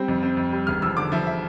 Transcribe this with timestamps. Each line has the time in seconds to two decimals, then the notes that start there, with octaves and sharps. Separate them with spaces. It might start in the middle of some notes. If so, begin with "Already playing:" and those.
Already playing: G3 C4
0.08 F2
0.23 C4
0.37 F2
0.53 G3
0.67 E1 F6
0.82 F3 E6
0.97 D3 D6
1.12 F3 E5
1.27 E5